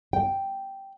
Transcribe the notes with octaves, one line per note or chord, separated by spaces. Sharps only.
G5